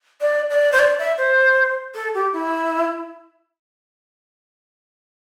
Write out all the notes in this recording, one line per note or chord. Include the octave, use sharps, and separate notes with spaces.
D5
D5
C5
D5
E5
C5
A4
G4
E4